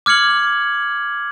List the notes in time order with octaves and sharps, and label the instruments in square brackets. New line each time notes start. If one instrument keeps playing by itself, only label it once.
[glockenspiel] D6 F6 G#6 C#7 F#7